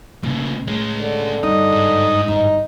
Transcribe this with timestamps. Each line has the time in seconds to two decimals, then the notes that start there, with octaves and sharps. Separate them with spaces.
0.23 A#1 A#2 C#3 A3
0.68 A2 G#3 C#4
1.01 D3
1.43 G2 D#4
1.72 G#2
2.28 G1 D#4